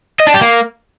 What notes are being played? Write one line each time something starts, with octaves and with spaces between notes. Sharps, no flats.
D#5
D4
G4
A#3